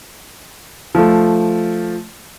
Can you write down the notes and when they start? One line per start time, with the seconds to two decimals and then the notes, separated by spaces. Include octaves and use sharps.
0.95 F3 A3